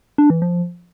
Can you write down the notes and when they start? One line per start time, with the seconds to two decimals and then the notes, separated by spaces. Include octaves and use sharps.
0.18 D4
0.30 E3
0.42 F3